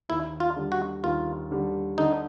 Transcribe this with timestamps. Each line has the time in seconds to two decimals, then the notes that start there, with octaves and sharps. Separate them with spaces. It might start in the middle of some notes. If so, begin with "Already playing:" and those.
0.09 D#2 E4
0.40 F4
0.56 D3 G3
0.72 F#4
1.03 D#2 F4
1.51 D3 G3
1.98 D3 D#4